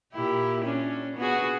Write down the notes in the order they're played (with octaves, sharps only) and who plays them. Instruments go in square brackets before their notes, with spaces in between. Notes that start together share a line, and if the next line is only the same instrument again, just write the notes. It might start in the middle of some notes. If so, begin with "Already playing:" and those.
[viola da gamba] A#2 E4 G4
C#4 D4
B3 F#4 G#4